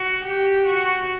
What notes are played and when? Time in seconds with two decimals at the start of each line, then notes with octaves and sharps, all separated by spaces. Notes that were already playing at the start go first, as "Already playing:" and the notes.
Already playing: F#4
0.24 G4
0.66 F#4